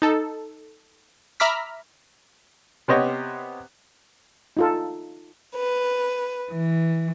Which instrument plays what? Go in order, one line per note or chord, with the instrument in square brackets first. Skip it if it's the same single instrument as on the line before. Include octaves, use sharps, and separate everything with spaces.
[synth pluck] D#4 A4
E5 A#5 B5 D6 F6 B6
[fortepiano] C3 B3 G4 C5 C#5 D#5
[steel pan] D#4 F4 A4
[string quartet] B4
E3